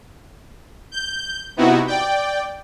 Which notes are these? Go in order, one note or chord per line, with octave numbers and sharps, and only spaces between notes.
G6
C3 B3 D#4 E4 F#4
D5 G5